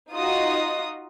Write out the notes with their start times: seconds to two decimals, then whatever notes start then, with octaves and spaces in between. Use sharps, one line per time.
0.12 D#4 F4 F#4 D#5 D#6